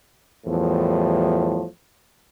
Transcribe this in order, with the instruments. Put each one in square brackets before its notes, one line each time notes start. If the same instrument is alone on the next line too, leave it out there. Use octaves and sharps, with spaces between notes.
[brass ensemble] E2 A2 F3 G3